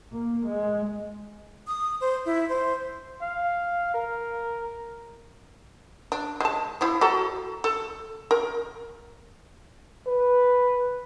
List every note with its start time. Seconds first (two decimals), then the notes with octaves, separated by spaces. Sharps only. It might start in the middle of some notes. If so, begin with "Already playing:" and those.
0.12 A#3
0.46 G#3
1.67 D#6
2.01 C5
2.26 E4
2.49 C5
3.21 F5
3.94 A#4
6.12 D4
6.40 G#3 A5
6.81 F3 E4
7.01 F#4 A4 A#5
7.64 A4
8.31 A#4
10.07 B4